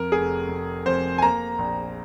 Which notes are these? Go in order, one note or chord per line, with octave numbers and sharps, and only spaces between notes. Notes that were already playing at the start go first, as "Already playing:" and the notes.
Already playing: F2 A#4
F1 G#4
F1
F2 C5
G#5
A#3 A#5
A#1